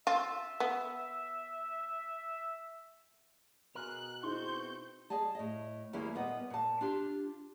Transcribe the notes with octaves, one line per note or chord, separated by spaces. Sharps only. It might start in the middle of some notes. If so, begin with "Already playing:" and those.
F4 E5
B3
B2 G#4 A#4 F#6
C4 D#4 E4 G#4 C6 C#6 G6
G#4 D5 D#5 G#5 A5
A2 D#5
D#2 G3 A#3 E4 F4 G#4
A#2 B3 D#5
A#2 A5
D4 F4 G4